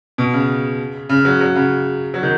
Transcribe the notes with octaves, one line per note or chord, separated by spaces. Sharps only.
B2
C#3
C#3
F#3
F#3
C#3
F#3
D#3